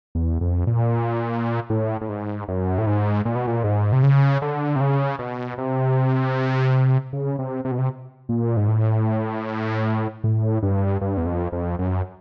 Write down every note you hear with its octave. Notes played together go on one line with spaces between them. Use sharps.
E2
F2
A#2
A2
A2
G#2
F#2
A2
G#2
A#2
B2
A#2
G#2
C3
C#3
D3
C3
C#3
B2
C3
C#3
C3
C3
B2
C3
A#2
G#2
A2
A2
G2
G2
E2
F2
F2
F#2